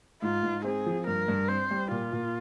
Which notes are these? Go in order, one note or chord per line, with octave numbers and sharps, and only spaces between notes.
G#2 F4
G#2
C4 G#4
F3
G2 A#4
G2
C4 C5
G3
A#2 F4
A#2